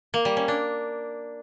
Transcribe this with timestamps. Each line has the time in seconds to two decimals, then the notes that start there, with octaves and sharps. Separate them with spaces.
0.14 A#3
0.25 G3
0.37 C#4
0.48 D4